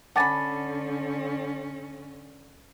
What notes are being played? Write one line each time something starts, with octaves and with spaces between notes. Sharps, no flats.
D3 C#4 F#5 G#5 A5 B5 D6 A6